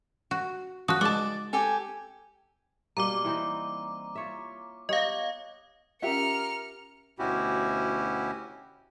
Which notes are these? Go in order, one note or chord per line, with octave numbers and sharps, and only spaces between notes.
F#4
F3 F#4 D#6 F#6
G#3 D5 F#5 A5 D6
G4 A4 G#5
B2 G3 A#3 A#5 D6
E3 C4 D#4
F4 C#5 E5
B3 G4 C#5 D#5 F5
C#4 F4 G4 A#4 E5 F#5 F6 C#7
D2 B2 C#4 E4 F#4 G4